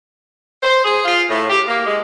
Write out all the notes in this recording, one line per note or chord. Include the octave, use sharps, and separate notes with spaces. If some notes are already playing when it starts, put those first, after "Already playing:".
C5
G#4
F4
A2
G4
A#3
G#3